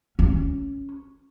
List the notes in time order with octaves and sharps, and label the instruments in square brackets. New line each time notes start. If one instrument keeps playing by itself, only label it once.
[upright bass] C#4